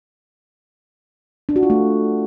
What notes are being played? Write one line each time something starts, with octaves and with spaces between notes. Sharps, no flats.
D4
F#4
F4
A3